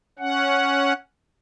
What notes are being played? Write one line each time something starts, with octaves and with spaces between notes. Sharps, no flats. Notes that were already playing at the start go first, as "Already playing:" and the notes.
C#4 F#5